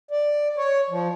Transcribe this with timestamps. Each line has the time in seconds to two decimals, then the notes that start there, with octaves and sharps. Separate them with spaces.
0.11 D5
0.57 C#5
0.90 F3